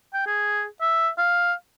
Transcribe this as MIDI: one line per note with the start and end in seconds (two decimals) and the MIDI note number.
0.14 0.22 79
0.26 0.65 68
0.81 1.09 76
1.18 1.53 77